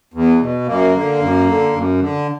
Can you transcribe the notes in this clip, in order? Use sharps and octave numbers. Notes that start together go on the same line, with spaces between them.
E2
B2
F#2 A#3
D3
F#2
D3
F#2
D3